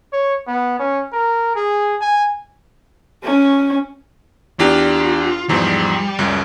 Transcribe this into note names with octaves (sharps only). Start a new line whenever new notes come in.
C#5
B3
C#4
A#4
G#4
G#5
C#4
E2 D4 F4 G4
E2 G#2 F3 G3
C#2 F#2